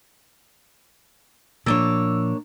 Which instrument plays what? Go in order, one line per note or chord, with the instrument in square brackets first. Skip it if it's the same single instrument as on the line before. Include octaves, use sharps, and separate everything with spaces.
[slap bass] A#2 F3 [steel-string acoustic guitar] A#3 D4 C#5 [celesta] E6